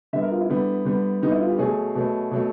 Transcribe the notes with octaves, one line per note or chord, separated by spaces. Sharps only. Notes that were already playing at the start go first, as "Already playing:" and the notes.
D3 G3 B3 E5
A#4
F4
E4
D3 G3 B3
D3 G3 B3
D3 G3 B3 D#4
E4
F4
G4
B2 F#3 A3 G#4
B2 F#3 A3
B2 F#3 A3